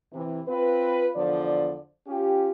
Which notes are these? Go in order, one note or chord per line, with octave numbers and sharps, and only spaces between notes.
C3 E3
C4 F4 B4
E2 D3 F3 D5
C#4 F4 G4